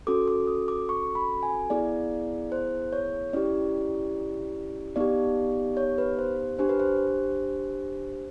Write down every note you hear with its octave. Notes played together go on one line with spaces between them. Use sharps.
C#4 F#4 A4 D6
D6
D#6
D6
C#6
B5
G#5
B3 E4 G#4 D5
C5
C#5
C#4 E4 G4 D5
B3 D#4 G4 D5
C#5
B4
C5
D4 G4 C5
B4
C5